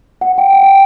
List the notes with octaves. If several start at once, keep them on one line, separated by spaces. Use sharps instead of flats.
F#5
G5
F#5
G5